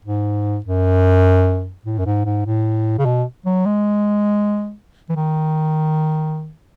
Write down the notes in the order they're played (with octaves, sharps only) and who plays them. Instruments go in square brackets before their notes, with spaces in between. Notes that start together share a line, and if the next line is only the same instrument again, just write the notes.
[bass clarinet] G#2
F#2
A2
F#2
G#2
G#2
A2
C#3
B2
F#3
G#3
E3
D#3